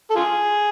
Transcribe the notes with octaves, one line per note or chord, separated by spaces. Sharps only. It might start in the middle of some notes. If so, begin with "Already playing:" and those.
A4
F4 G#4